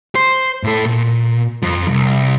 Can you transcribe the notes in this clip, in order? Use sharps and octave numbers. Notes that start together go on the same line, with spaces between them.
C5
A2 A4
A#2
F2 F3
C2